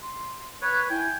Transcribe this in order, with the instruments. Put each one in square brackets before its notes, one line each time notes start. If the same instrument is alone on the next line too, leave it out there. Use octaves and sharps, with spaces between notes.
[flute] C6
[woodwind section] B4 C#5 [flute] F#6
[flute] E4 [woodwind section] G5 G#5